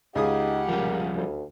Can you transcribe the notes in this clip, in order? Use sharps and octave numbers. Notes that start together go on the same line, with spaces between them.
C#2 D#4 G4 G#4 F#5 D#6
A#2 F3 G3 C#4
D2